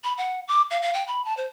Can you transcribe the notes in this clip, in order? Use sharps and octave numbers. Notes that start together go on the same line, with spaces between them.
B5
F#5
D6
F5
F5
G5
B5
A5
C5